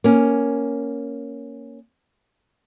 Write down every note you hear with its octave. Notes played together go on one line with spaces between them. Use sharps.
A#3 C#4